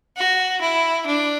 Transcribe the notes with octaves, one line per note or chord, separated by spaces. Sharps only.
F#4
E4
D4